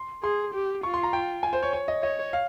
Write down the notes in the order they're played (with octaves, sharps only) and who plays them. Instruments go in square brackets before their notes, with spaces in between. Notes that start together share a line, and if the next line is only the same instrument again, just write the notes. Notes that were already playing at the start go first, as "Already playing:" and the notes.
Already playing: [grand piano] C6
[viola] G#4 [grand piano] C6
[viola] G4
[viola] F4 [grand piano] C#6
[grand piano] C6
A#5
G5
G#5
C5
C#5
C#5
D#5
[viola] C#5 [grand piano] D#5
[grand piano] F5